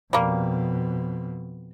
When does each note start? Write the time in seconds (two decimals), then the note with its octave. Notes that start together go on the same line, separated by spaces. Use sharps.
0.13 F2 B2 G3 A#3